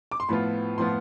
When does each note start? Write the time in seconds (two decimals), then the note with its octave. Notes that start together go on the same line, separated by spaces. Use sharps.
0.11 D6
0.20 C6
0.29 A2 F3 B3 F4 B5
0.77 A2 F3 B3 F4 C6